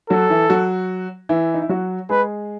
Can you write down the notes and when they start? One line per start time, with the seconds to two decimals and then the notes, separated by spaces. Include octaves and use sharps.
0.10 F#3 F#4 A4
0.30 E3 E4
0.50 F#3 F#4
1.29 E3 E4
1.54 D#4
1.62 E4
1.69 F#3 F#4
2.09 G#3 G#4 B4